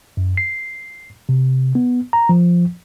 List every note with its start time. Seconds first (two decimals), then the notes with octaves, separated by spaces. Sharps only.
0.17 F#2
0.37 C7
1.29 C3
1.75 B3
2.13 A#5
2.29 F3